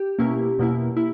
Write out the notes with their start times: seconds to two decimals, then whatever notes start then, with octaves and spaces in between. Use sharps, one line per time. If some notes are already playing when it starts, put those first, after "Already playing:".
Already playing: G4
0.19 B2 A#3 C#4 E4
0.58 E2 B2 A#3 E4
0.97 A#3 E4